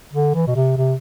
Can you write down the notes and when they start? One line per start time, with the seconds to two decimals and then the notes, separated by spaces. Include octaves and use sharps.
0.13 D3
0.35 E3
0.47 B2
0.56 C3
0.78 C3